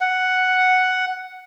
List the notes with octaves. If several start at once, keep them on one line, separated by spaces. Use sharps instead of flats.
F#5